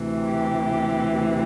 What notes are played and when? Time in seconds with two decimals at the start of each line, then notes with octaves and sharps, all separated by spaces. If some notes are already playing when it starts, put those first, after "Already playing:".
Already playing: D2 C3 E3
0.22 G4